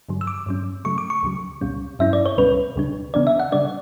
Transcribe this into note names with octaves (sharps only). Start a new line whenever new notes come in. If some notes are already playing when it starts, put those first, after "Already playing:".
G2 D3 F#3
E6
D6
G2 F#3 C#4
C#3 F#3 A3 C#6
D6
C#6
D2 C#3 F#3
C#2 B2 G3 C#4
G2 F#3 C#4 E4 E5
D5
C#5
C#2 B2 G3 C#4 B4
D2 C#3 G3 D4
C#3 E3 B3 D4 D5
E5
F#5
C#3 G3 D4 D5